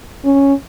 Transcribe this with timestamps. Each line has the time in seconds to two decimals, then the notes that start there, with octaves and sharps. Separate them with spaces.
0.25 C#4